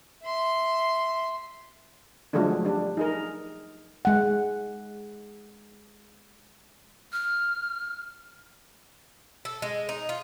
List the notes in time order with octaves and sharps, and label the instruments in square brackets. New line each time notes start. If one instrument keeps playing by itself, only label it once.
[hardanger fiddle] E5 C6
[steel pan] D3 F3 F#3 G#3 A3 D4
G3 D4
D#4 G#4 A#4
[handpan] G#3 F#5
[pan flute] F6
[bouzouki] A4
G#3
D#4
F4